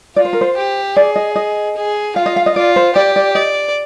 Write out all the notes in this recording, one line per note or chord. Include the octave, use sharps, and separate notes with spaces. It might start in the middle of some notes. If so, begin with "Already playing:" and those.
F4 D5
C5
A#4
C5
G4
G#4 D5
D#5
D#5
G#4
F4 F5
D#5
F5
D#5
F4 D5
C5
G4 D5
D5
D5 D#5